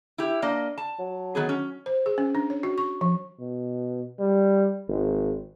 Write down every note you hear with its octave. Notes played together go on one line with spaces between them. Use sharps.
E4 G4
A#3 D4 D#5
A5
F#3
D#3 B3 G#4
C#4
C5
G#4
C#4
D4
C#5
F#4
C#6
F3
B2
G3
G#1